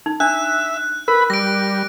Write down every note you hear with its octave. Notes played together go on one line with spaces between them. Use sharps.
D#4
D4 E5 F#6
A#4 B4 B5
G3 A#6 D7